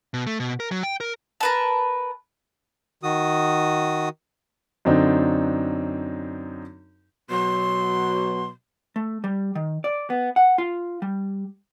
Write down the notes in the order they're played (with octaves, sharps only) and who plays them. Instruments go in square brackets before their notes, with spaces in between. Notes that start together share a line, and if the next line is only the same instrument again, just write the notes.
[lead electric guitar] B2
A3
B2
A#4
F#3
G5
A#4
[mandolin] A#4 B4 A5
[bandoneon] D#3 F#4 D#6
[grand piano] F#2 D3 C4 D4 D#4
[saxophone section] B2 F#3 [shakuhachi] C6
[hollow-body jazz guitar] A3
G3
D#3
D5
B3
F#5
F4
G3